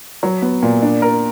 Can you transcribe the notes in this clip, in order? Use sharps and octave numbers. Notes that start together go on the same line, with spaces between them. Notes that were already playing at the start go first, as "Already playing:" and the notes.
F#3
B3
A#2
D4
A#4